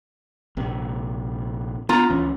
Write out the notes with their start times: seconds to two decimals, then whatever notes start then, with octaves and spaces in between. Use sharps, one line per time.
0.57 A#1 C3
1.89 B3 F4 A#5
2.10 C#2 E3 C#4